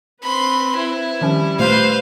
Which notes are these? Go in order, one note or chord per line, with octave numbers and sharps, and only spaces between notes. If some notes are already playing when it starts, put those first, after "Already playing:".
C4 B4 B5 C6
E4
D#3 F3 G3 C#4
A#2 A3 B4 C5 F5